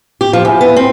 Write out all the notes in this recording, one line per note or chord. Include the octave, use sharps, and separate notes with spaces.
G4
F3
E2
B3
C4